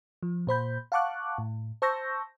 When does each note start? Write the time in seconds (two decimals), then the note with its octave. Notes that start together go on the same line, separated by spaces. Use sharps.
0.23 F3
0.47 A#2 C5 B5 G6
0.92 F5 F#5 A5 C#6 D6 F#6
1.38 A2
1.82 C5 A5 C#6 E6 G6 A#6